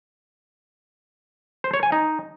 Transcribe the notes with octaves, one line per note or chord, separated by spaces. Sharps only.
C5
C#5
G#5
D#4